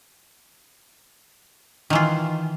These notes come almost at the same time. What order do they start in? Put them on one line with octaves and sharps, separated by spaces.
D#3 E3 F4